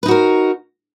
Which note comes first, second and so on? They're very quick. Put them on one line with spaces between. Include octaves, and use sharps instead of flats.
B4 D#4 F#4 A#4